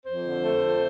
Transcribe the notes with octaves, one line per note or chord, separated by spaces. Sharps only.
F2 C5
D3
A3
F2